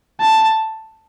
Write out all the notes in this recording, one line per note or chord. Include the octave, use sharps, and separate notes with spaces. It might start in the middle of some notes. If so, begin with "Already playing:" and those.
A5